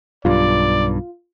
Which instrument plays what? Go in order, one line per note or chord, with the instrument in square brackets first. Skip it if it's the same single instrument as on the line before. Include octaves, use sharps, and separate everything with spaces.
[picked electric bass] B1 G2 [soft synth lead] F4 [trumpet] D5